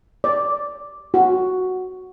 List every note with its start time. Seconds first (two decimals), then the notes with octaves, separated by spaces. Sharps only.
0.24 D5
1.14 F#4